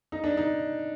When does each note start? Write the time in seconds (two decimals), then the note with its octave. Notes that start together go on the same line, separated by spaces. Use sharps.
0.12 D#4
0.24 D4
0.37 D#4